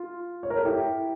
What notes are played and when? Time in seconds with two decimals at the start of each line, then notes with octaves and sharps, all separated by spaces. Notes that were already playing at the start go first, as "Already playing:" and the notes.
Already playing: F4
0.43 C#5
0.50 A#4
0.58 A4
0.65 E4 G4